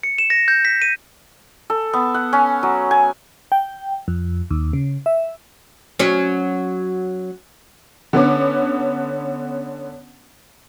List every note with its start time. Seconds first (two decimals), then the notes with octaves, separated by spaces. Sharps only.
0.03 C#7
0.18 E7
0.30 A#6
0.48 G6
0.65 B6
0.82 D#7
1.70 A4
1.93 B3
2.15 F#5
2.33 C#4
2.63 F#3
2.91 G#5
3.52 G5
4.08 F2
4.51 D#2
4.73 C#3
5.06 E5
5.99 F#3 C#4
8.13 D3 B3 C#4 D6